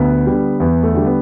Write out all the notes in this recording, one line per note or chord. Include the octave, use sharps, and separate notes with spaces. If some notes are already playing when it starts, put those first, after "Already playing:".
Already playing: D2 B3
D3 G3
E2 B3
A3
D3 G3
B3